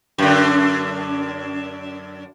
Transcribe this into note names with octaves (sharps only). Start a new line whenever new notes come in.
F#2 D3